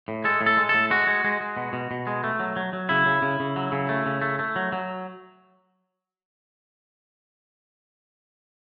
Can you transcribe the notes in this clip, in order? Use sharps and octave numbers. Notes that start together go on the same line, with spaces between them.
A2
G#3 A4
A2
A4
G#3
A4
A2
G#3 F#4
G#3
G#3
G#3
B2
B2
B2
G#3
A3
F#3
F#3
F#3
C#3 E4
C#3
C#3
C#3
F#3
C#3
A3
C#3
A3
A3
F#3
F#3